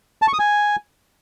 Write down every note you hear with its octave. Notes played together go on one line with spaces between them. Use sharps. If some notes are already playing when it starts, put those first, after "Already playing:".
A5
C#6
D#6
G#5